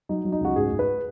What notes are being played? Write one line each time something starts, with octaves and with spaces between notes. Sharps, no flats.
F#3 D#4
F#3
D#4
C#2 F#4
G#2 G#4
G#2
B4